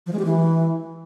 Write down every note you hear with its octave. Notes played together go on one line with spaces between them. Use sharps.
F3
G#3
G4
E3